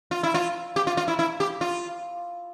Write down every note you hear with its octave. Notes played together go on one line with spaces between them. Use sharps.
F4
E4
F4
G4
F4
F4
E4
E4
G4
F4